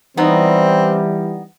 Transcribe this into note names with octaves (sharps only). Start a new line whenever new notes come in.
E3 G3 B3 C4 D#4